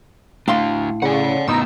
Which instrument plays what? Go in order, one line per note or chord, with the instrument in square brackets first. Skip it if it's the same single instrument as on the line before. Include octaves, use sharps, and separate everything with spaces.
[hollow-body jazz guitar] A2 F5 C6 [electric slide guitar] A3 D4
[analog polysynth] C#3 [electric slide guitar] D5 F#5
[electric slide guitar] A2 C#3 B3 [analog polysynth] D#4 E6